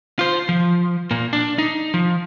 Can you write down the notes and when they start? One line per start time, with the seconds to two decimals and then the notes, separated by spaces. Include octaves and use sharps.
0.19 F4 C5
0.49 F3
1.11 A#2 A#3
1.33 D4
1.58 D#4
1.94 F3